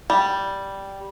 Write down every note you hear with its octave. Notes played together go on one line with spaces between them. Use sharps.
G3